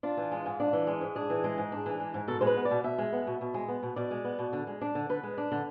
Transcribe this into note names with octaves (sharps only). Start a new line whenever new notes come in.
D4 F4
E3
G#3
G#2
D4
E3
G#3
G#2
D4 G#4
E3
G#3
G#2
D4
E3
G#3
G#2
B2 A4
G#3 C5
B4
B3
D5
B2
B2 E5
G#3
B3
B2
B2
G#3
B3
B2
B2 D5
G#3
B3
B2
D3
G#3
D4
D3
D3 B4
G#3
D4
D3